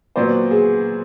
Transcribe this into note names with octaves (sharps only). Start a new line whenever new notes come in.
A#2 F#3 B3 C5 D5
G#4